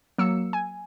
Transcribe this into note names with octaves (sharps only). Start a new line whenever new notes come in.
F#3 A#3 E6 C#7
G#5